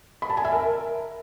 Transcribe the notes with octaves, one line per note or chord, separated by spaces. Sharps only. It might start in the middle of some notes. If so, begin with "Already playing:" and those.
B5
A5
G#5
E5
A#4